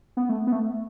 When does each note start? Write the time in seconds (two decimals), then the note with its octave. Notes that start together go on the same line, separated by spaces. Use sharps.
0.17 B3
0.29 A3
0.47 B3
0.52 A3